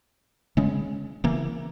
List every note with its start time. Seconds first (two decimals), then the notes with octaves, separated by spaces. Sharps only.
0.57 C#3 G#3 C#4
1.24 C#3 E3 A#3